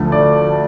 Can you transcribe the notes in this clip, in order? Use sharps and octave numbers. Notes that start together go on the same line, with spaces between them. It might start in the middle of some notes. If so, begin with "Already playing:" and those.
Already playing: D2 D3 F3 A3
D5